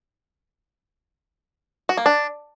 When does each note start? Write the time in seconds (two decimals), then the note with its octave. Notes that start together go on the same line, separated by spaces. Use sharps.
1.89 F#4
1.97 A#3
2.06 D4